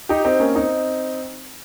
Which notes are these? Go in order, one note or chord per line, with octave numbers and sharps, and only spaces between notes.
D#4 G4
C4 D#4
A#3 C#4
C4 D#4